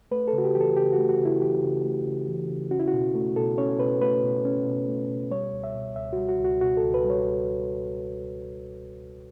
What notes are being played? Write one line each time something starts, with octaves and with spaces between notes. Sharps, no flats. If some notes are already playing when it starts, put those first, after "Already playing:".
A3 B4
A4
C#3
F#4
G4
E3 G4
A4
C#3 G4
F#4
A3
F#4
C#3
E4
E3 G4
C#3
A3
C#3
E3
C#3
C#4 F#4
E4
F#4
B2
A3
B2 A4
C#4 C#5
B2 B4
A3 B4
B2
C#4
B2
A3
B2
G3 C#5
C#2
E5
B2
C#2 E5
F#4
G3
F#4
C#2
F#4
B2 F#4
A4
C#2
B4
G3
C#5